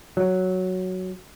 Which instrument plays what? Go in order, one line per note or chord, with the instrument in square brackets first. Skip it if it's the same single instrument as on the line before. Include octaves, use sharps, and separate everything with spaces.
[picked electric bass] F#3